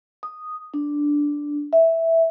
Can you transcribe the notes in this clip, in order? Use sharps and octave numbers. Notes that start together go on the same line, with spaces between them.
D#6
D4
E5